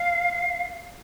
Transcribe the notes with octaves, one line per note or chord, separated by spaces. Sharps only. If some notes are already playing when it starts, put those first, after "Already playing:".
Already playing: F5